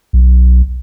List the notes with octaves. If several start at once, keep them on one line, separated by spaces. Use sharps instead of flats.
B1